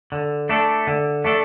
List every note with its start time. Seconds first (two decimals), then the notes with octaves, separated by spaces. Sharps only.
0.12 D3
0.49 A3 D4 A4
0.87 D3
1.25 A3 D4 A4